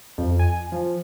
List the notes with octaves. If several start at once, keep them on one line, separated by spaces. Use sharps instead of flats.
F2
G#5
F3